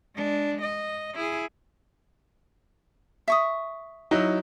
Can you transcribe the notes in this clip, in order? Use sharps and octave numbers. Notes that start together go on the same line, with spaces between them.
G#3 D4
D#5
E4 G#4
E5 C#6 D#6
F#3 D#4 E4